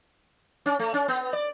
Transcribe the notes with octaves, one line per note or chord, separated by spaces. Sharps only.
C#4
A3
C#4
B3
D5